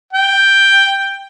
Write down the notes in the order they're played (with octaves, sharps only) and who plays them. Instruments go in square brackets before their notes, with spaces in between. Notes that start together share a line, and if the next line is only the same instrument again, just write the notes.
[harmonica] G5